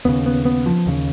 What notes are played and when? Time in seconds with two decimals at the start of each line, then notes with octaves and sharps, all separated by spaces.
0.05 D#2 C#3 B3
0.26 B3
0.45 B3
0.66 F3
0.86 D#2 C#3